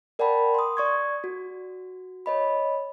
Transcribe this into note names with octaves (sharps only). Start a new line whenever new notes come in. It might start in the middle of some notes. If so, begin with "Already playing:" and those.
A#4 D5 F#5 G5 A5 B5
C6 D#6
D5 C#6 G#6
F#4
C#5 D#5 B5